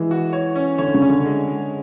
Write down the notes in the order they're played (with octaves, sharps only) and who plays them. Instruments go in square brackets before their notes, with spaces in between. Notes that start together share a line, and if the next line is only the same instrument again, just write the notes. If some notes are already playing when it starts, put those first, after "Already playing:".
Already playing: [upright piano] E3 [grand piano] G#3
[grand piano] F#4
C#5
C#4
[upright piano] D3 [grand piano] C#5
[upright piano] C#3
[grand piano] C#4
[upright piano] D3
[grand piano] G#3
G#3